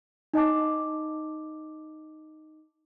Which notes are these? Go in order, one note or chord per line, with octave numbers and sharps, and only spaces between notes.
D#4 D#5 A5 D6